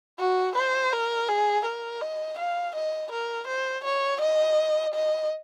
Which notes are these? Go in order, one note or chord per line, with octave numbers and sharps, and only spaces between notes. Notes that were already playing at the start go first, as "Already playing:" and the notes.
F#4
C5
A#4
G#4
A#4
D#5
F5
D#5
A#4
C5
C#5
D#5
D#5